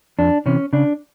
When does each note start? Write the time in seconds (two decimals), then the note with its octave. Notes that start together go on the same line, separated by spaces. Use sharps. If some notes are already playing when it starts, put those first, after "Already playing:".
0.19 F2 D4
0.46 C3 E3 C#4
0.73 C#3 D4